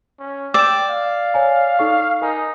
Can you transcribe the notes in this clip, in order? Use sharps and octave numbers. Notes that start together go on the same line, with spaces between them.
C#4
D5 G5 E6 E7
F5
C#5 G#5 A#5
D#4 A4 C#6
D#4 A#4 G#5